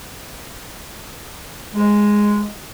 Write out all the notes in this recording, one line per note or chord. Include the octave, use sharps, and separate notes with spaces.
G#3